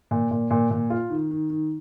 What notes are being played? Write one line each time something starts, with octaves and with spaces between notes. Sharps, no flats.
A#2
A#2
A#2
A#2
F4
D#3
D#3
D#3